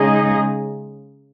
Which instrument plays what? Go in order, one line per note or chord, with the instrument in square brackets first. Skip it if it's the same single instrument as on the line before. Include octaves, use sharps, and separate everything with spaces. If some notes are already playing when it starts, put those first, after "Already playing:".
Already playing: [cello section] C#3 G#3 D#4 G#4 D#5